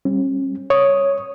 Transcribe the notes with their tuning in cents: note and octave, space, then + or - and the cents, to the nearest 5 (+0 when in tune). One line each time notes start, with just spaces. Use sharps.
G3 +0 C#4 -40
C#5 +0 D#6 +0